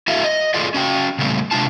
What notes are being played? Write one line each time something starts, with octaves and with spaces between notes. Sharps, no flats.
E4 F#4 A4 E5 F5
D#5
F4 G#4 A4 D5 D#5
C#4 F#4 G5
A#2 C#3 G3 A3 B3 C4
C3 G#3 D4 F4 A5